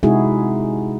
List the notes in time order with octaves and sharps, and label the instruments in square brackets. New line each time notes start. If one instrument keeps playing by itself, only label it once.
[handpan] C3 G#3 D#4 E4 F#4 G#4